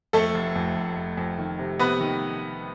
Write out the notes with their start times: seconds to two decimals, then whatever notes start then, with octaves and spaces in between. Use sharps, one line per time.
0.13 F2 A3 A4
0.34 F1
0.56 F2
0.76 F1
0.96 F1
1.17 F2
1.38 D#3
1.59 C3
1.79 C3 B3 B4
2.01 D#3